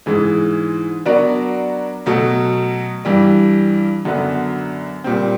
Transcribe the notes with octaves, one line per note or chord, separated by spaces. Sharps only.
G#2 E3 G#3
F#3 B3 D4 F#4 A#4
B2 F#3 A3
G2 E3 G3
F#2 D3 F#3 B3
A#2 G3 C4